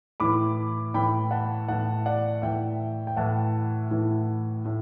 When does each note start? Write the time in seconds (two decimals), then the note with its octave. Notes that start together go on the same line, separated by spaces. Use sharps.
0.20 A2 E3 B5 D6
0.94 A2 E3 G5 B5
1.31 F#5 A5
1.68 A2 E3 F#5 A5
2.06 D5 F#5
2.42 A2 E3 E5 G5
3.07 G5
3.16 A2 E3 F#5 A5
3.91 A2 E3
4.65 A2